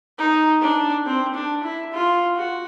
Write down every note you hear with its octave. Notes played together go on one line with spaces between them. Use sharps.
D#4
D4
C4
D4
E4
F4
F#4